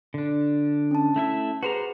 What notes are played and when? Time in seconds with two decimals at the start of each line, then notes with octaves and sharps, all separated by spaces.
0.14 D3 D4
0.91 C#4 A5
1.16 A3 E4 E5
1.63 F#4 G#4 B4 C5 A#5